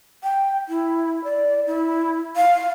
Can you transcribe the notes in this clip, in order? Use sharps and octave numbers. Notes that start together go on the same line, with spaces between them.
G5
E4
D5
E4
F5